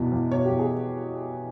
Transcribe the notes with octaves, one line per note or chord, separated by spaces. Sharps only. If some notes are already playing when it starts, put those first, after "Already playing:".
Already playing: E2 B2 E3
E2
B2 C#5
G4
E2
G#4